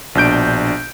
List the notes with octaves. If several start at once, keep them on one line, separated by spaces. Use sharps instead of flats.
A#1 B2 D4 G6 D7